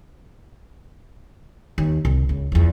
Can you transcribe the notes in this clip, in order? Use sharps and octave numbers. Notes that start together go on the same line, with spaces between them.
D#2
C2
C#2
E2 F3